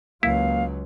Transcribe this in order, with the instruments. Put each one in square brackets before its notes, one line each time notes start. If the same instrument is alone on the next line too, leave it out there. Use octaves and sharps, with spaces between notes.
[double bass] C#2 F#3 [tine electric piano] A#3 [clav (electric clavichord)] E4 [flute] F5